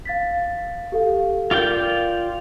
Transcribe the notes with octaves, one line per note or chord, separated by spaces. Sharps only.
F5 A6 B6
G4 A4 F5
F4 A#4 D5 G5 G6 G7